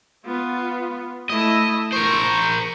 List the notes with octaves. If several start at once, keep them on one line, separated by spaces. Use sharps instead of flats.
B3 F4
A3 E4 D#5
A#4 C5 C#6